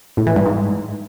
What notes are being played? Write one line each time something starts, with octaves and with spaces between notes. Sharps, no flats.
A2
E3
G2
G#2